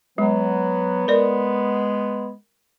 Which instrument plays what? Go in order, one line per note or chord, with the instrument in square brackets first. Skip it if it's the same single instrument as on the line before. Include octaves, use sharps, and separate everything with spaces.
[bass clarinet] F#3 [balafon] G#3 [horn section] B3
[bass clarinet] G#3 [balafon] A#4 D5